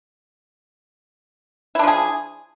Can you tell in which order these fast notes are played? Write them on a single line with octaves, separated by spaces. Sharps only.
E4 D4 F3 G#4